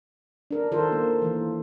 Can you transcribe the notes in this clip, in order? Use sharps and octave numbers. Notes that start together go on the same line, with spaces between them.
D4 A#4
D#3 F4 A4 A#4 C5
A#3
E3 A#3